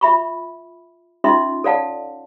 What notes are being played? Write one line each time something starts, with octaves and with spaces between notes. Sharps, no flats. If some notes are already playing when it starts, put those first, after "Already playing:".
F4 E5 B5 C#6
C#4 D#4 F4 D#5 E5 C6
A4 C#5 D5 F5 F#5 A5